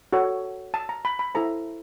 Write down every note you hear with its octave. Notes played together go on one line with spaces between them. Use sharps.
F#4 A4 C#5
A5
A#5
B5
B5
E4 A4 C5 A#5